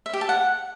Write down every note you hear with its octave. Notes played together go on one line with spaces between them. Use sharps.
E5
G4
A5
F#5